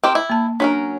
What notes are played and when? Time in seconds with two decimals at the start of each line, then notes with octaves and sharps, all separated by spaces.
0.04 C4 G4 A#4
0.15 E4
0.30 A#3 A5
0.60 F#3 C#4 D4 A#4